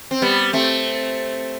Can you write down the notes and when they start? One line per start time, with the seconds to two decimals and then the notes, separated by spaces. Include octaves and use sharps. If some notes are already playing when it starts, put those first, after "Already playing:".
0.11 C4
0.22 G3 B3
0.53 A3 C4